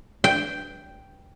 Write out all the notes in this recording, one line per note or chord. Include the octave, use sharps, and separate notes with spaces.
G5